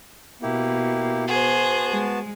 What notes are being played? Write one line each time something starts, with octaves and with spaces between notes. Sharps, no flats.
B2 A#3 E4 G4
B3 F#4 G#4 C5 A5
G#3